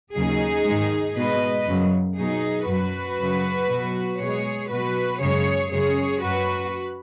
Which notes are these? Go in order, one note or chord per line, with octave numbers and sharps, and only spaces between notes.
D#2 C#3 F#3 D#4 G#4
G#2 D#3 G#3
B2 G#3 B4 D#5
F#2 C#3 F#3
B2 F#3 D#4 G#4
F#2 F#3 F#4 B4
F#2 C#3 F#3
B2 F#3
B2 G#3 G#4 C#5
B2 F#3 F#4 B4
F#2 C#3 G#3 G#4 C#5
F#2 C#3 G#3 G#4 C#5
F#2 F#3 F#4 B4